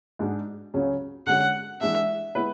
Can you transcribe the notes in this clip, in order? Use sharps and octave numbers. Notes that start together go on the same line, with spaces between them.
G#2 G#3 D4 F#4
C#2 C#3 F#3 C#4 G#4
D3 G#3 C#4 F#4 F#5
E3 G#3 D4 E5
G#3 B3 E4 B4